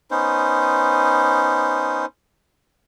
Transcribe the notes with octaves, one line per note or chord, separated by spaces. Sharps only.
B3 C#4 D#4 C5